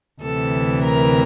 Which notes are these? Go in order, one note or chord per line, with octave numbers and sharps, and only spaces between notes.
D2 C3 E3 A4
A#4